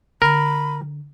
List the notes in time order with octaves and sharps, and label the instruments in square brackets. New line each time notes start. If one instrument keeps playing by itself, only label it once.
[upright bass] D3 [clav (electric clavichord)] A#4 [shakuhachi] B5